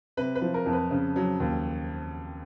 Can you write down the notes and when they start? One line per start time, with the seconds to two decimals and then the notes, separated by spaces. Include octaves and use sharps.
0.17 C3 B4
0.35 B4
0.41 F3
0.54 A#4
0.66 F2
0.73 B4
0.91 C#3
1.16 F#3
1.40 D#2